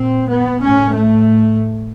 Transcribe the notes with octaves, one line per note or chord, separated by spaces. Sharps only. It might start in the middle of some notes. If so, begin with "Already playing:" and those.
Already playing: A#2 C4
B3
A2 C#4
A3